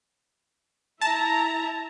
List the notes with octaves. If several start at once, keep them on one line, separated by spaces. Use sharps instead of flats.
E4 E5 A5 A#5